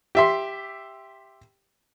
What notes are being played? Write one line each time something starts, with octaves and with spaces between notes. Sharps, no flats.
G4 E5 C6